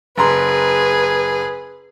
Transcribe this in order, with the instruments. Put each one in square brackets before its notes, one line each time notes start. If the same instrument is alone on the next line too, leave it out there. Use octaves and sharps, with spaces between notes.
[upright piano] F#1 A#5 C6 [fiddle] G#4 B4